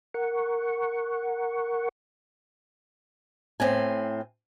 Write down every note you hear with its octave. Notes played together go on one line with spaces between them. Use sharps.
A#4 F#5 C#6
A2 C4 G#5